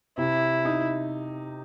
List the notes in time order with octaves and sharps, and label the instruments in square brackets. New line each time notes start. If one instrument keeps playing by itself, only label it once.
[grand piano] C3 [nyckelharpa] E4
[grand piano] D#4